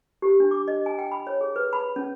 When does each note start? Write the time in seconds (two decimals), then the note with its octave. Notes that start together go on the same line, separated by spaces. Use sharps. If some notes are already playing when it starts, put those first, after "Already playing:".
0.22 G4
0.40 D4
0.51 D6
0.68 D#5
0.86 G#5
0.99 G5
1.12 B5
1.27 C#5
1.41 G#4
1.56 B4
1.73 B5
1.96 C#4